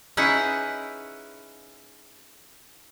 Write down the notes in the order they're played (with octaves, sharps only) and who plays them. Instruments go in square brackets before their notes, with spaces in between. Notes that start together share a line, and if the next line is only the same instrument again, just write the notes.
[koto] C#4 D#4 E4 G#4 B4 F#5